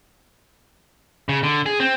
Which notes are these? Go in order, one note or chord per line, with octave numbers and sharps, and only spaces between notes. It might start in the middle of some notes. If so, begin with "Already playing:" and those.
C#3
D3
G#4
C4